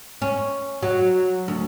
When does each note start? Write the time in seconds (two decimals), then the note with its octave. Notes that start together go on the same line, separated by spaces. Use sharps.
0.22 C#4
0.83 F#3
1.48 D2